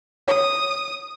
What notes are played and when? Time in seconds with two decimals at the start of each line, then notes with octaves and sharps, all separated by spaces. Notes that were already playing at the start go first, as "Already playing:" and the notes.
0.28 C#5 D#6